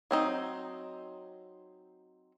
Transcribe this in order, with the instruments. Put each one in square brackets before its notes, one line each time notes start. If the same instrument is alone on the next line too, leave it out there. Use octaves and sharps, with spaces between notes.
[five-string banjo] F#3 C4 D#4